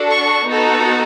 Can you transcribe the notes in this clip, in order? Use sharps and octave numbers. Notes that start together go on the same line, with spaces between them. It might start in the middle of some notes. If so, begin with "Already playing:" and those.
Already playing: D4 F#4 A4
C#6
B3 D#4 F#4 A4